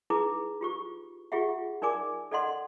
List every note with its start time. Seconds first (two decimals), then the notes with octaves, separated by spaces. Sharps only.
0.10 D#4 E4 G#4 B4 D6
0.61 F4 G4 C#6
1.32 F4 G4 G#4 E5 F#5
1.82 D#4 A#4 D5 G#5 D6
2.31 A4 D5 D#5 F#5 C6